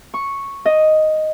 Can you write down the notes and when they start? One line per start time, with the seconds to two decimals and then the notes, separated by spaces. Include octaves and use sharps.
0.14 C#6
0.65 D#5